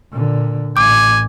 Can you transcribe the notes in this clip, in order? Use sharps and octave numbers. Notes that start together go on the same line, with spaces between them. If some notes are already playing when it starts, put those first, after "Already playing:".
A#2 D3
A1 G#5 D6